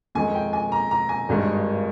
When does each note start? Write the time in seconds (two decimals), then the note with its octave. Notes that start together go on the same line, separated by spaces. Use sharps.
0.15 F2 D#3 G#3 G#5
0.35 G5
0.53 G#5
0.72 A#5
0.91 A#5
1.09 G#5
1.29 G#1 G2 D#3 G#3